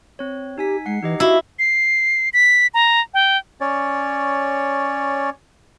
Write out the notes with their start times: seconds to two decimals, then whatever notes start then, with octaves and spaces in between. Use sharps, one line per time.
0.19 C4 C#5
0.58 D#4 G4 G#5 B6
0.86 G#3 F#5 C7
1.02 E3 D#4 G4 D#5
1.20 E4 F#4 F5
1.59 C7
2.33 B6
2.74 A#5
3.14 G5
3.61 C#4 C#5 D5